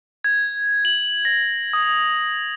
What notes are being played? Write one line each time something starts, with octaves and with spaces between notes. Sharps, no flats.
G#6
F#7
A#6
D#6